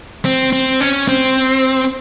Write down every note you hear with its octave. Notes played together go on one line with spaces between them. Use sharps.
C4
C4
C#4
C4